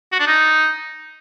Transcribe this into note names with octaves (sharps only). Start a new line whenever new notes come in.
F#4
D4
D#4